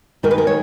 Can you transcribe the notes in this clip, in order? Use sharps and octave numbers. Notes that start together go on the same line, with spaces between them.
D#3 G#3 D#4 A#4
B4
A#4
C#5